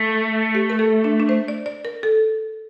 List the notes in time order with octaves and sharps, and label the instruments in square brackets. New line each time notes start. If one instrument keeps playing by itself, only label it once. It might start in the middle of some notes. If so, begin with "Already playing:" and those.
Already playing: [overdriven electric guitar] A3
[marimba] G4
A#4
A4
D4
D4
C5
D5
D5
A#4
A4